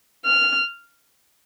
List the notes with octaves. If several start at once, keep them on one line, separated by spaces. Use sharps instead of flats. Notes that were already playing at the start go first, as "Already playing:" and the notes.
F6